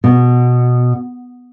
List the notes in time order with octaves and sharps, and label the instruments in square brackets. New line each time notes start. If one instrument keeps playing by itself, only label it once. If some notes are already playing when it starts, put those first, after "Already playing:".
[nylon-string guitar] B2